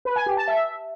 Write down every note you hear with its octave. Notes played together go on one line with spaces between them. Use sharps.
B4
G#5
G4
A5
E5